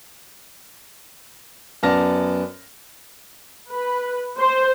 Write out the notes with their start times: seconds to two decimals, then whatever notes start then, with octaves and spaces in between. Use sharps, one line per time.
1.83 F#2 B3 D5 A5 F6 A#6
3.71 B4
4.38 C5